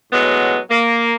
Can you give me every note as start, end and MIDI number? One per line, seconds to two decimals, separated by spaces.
0.12 0.58 45
0.12 0.58 54
0.12 0.58 56
0.12 0.58 59
0.70 1.14 58